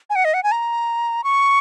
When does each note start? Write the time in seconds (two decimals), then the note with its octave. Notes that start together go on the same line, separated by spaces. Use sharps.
0.10 G#5
0.16 F#5
0.25 D#5
0.34 F#5
0.43 G#5
0.52 A#5
1.24 C#6